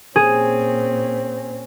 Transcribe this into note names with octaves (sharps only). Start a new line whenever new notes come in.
A#2 C4 C#4 G#4